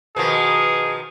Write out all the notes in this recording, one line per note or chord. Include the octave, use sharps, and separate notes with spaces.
B2 D#3 F3 G#4